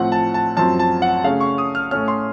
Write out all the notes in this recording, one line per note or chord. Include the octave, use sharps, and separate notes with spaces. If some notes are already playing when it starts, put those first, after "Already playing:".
Already playing: A2 F3 C4 F#5
A5
A5
F#2 F3 C4 A5
A5
F#5
C#3 A3 C#4 F5
C#6
D#6
F6
A2 A3 C#4 F6
C6